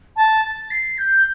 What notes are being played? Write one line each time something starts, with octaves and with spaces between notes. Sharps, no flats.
A5
A6
C7
G6